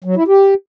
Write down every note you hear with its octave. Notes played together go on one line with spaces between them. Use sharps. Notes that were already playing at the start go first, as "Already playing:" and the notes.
F#3
E4
G4